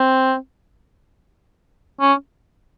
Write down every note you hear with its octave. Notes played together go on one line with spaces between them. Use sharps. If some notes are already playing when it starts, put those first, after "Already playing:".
Already playing: C4
C#4